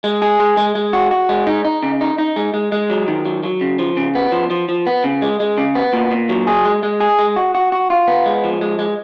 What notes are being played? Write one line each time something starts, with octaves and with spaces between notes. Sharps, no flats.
G#3
G#4
G#3
G#3
G#3
F#4
F#4
G#3
D#4
D#4
C#3
D#4
D#4
G#3
G#3
G#3
F#3
D#3
F#3
F#3
C#3
F3
C#3
B3
F3
F3
F3
B3
C#3
G#3
G#3
C#3
B3
A#2
A#2
F#3
G#4
G#3
G#3
G#4
G#3
F#4
F#4
F#4
F4
B3
G#3
F3
G#3
G#3